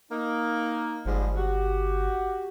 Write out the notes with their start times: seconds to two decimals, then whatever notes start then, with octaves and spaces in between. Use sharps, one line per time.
0.11 A#3 D#4
1.05 G1 G#2 F3 G3
1.37 F#4 G4